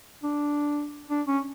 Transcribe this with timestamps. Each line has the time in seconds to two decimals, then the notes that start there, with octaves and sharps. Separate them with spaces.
0.23 D4
1.10 D4
1.27 C#4